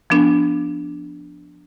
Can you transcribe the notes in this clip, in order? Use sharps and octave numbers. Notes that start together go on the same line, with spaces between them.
F3 B3 D4